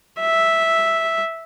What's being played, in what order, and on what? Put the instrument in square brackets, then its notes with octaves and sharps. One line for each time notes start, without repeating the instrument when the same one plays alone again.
[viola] E5